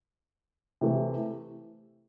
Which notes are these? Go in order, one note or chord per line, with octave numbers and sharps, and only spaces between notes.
C3 E3 A3